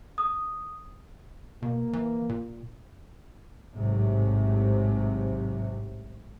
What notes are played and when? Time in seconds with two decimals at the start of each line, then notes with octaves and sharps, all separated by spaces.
0.18 D#6
1.62 B2 A#3
1.93 E3
2.29 A#2
3.74 A1 G#2 C3 F#3